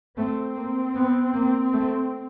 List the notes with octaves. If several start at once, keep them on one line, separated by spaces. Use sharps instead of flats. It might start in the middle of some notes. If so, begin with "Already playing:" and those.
A3 C4
A#3
B3
A#3
A3